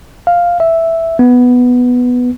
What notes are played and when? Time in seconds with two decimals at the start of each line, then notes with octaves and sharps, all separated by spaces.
0.27 F5
0.60 E5
1.19 B3